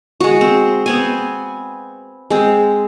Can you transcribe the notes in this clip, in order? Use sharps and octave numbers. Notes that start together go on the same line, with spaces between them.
G#3 F#4
C4
B3 C4 G#5
G#3 C4